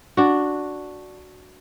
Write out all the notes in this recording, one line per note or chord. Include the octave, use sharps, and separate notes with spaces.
D4 F#4